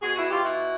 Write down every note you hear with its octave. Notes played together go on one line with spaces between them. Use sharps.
B2 F#4 G#4
E4 F#4
F4 G4
E4 F#4